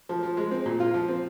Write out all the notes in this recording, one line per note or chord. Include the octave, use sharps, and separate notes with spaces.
F3
F3
G#3
C4
A#2
F4
F3
C4